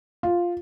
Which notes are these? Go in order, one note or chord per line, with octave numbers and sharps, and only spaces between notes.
F4